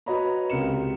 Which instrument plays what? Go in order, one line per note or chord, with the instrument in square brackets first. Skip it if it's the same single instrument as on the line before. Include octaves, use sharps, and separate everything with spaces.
[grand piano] F#4 B4 C#5 D#5 A#5 B5
C#2 C3 A#4 C#7 E7